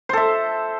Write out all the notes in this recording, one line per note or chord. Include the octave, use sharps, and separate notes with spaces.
A4 C5 E5